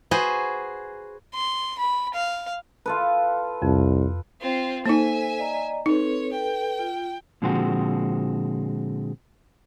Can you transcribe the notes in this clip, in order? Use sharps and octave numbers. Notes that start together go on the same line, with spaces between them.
F#4 G#4 B4 C5
C6
B5
F5
F4 A4 B4
C2 F2
C4 F4
A#3 D#4 A4 C5 E5 G#5
D5 D#5 A#5
C4 D#4 A4 B4 C#5
A4 B4 G5
F4
A#2 D3 F3 G#3 C4 F#4